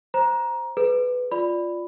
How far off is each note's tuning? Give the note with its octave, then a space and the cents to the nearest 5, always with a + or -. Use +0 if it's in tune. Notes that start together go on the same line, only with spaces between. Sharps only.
C5 +0 A#5 +20
G#4 +45 B4 +10
F4 +0 D5 +0 B5 +5